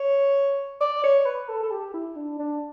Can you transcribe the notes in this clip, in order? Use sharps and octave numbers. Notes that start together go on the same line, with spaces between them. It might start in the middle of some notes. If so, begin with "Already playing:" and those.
Already playing: C#5
D5
C#5
B4
A4
A4
G4
E4
D4
D4